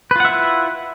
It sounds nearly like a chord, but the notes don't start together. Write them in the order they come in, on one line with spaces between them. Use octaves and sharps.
B4 F4 F#5 E5 E4